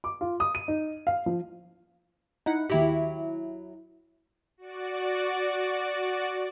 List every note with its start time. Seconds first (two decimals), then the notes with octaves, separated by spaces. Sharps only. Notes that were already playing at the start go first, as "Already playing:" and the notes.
0.04 D6
0.21 F4
0.40 D#6
0.55 D#7
0.68 D#4
1.07 F5
1.26 F3
2.46 D#4 E4 F#5
2.70 D#2 F#3 E4 G4
4.57 F#4 D5